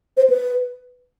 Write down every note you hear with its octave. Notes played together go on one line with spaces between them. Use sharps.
C5
B4